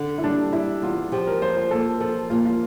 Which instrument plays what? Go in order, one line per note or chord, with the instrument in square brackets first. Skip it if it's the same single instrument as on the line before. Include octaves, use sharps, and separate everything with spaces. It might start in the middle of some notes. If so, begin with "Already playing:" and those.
Already playing: [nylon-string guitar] D3
[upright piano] E4
[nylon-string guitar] G3 [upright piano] D4
[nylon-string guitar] G3 [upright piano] E4
[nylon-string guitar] E2 [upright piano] F4
[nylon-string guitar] F3 [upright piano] G4
[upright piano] A#4
[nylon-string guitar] F4 [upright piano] C5
[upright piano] C5
[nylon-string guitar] A#3 [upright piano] A4
[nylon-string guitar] F3 [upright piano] A4
[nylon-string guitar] A#3 [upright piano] F4
[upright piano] F4